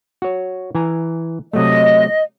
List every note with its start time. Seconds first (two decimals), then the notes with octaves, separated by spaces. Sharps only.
0.22 F#4 C#5
0.75 E3 G#5 A#5
1.53 C3 F#3 A3 D#5